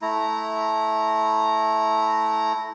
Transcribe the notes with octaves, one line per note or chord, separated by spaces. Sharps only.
A3 E4 A#5